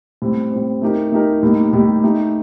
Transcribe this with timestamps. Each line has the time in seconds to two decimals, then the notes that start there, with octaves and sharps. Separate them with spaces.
0.22 A2 G3 C4
0.52 A2 G3 C4
0.81 A3 D#4 G4 A#4
1.12 A3 D#4 G4 A#4
1.43 A2 G3 A#3 D#4 G4
1.73 A2 G3 A#3 D#4 G4
2.03 A3 D#4 G4